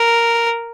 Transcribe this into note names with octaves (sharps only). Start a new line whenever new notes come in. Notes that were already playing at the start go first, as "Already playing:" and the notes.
Already playing: A#4